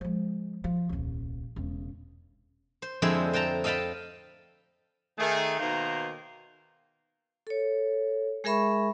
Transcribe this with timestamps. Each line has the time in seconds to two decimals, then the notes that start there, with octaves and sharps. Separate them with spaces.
0.01 F3 G#3
0.64 F3
0.89 D#1 C2
1.56 E1 C#3
2.82 C5
3.02 F2 D3 G#3 C4 E4 G#4
3.33 C5 G5 A5 A#5
3.64 A4 D#5 F5 G5 A5 B5
5.19 D#3 A3 G#4
5.59 B2 D#3 A#3 D#4 C5 A#5
7.47 A4 C#5
8.44 G#3 G#4 A#4 E5 B5 C#6